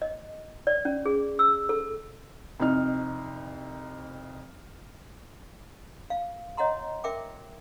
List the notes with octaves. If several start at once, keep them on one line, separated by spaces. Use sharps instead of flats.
D#5
D5
C#4
G#4
E6
A4
C2 F2 D#4 F6
F5
C#5 D#5 F#5 A#5 C6
A#4 E5 G5 D6